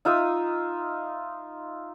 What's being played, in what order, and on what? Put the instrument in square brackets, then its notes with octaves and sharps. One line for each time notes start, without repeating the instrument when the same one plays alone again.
[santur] D#4 F4 E5 D#6